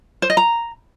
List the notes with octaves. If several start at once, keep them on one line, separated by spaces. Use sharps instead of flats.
C5
D#5
A#5